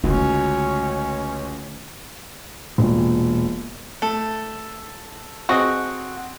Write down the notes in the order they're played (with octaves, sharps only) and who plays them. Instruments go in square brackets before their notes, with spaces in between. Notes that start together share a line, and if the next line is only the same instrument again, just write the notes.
[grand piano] C#2 [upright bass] D3 A3 [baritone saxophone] C#4 [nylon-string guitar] F#4
[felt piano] E1 A#2
[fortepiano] A3 [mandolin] A4
[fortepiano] C4 G#4 D#5 [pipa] F#4